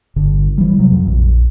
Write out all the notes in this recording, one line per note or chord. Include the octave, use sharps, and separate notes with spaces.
G1 D3
E3 G3
C3 F#3
F2 F#3
A#1